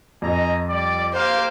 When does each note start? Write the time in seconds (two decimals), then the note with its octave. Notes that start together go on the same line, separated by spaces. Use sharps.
0.22 F2 D#5 G#5 A#5
0.67 G3 D5
1.14 A#3 G4 C5 F5